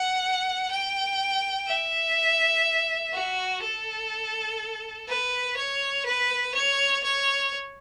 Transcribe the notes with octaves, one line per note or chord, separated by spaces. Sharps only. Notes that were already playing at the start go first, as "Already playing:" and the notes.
Already playing: F#5
G5
E5
F#4
A4
B4
C#5
B4
C#5
C#5